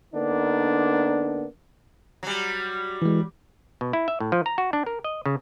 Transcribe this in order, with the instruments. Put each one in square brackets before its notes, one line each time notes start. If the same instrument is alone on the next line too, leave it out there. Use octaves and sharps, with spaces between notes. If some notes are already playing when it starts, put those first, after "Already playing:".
[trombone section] D3 A#3 B3 D4 D#4
[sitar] F#3 G3
[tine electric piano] E3 G#3
[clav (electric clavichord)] B2
E4
E5
A2
F3
A#5
F#4
D4
A#4
D#5
C#3